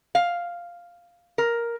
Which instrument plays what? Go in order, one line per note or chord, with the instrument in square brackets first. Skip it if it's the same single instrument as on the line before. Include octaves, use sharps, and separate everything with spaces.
[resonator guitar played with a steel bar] F5
A#4